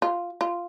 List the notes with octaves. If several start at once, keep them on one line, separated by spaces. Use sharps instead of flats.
F4
F4